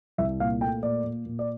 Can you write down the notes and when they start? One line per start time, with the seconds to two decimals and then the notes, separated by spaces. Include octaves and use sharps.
0.18 C2 E5
0.40 A#2 F5
0.61 A3 G5
0.83 A#2 D5
1.04 A#2
1.26 A#2
1.39 D5